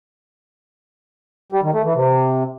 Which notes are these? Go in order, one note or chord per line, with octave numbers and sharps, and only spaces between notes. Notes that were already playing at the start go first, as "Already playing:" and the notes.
G3
D#3
A3
E3
C3